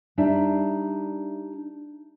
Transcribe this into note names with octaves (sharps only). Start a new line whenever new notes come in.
G3 D4 D#4 D5 E5